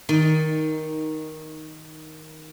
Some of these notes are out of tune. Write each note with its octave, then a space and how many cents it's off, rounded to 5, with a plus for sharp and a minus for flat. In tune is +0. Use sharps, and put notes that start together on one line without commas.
D#3 +10 D#4 +0 D5 +0